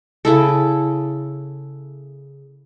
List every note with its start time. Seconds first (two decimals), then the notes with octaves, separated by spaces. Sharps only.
0.25 C#3 E4 A4